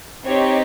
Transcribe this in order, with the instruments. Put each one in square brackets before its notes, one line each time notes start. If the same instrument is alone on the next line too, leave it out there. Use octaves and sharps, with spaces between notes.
[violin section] C4 D#4 G4 C#5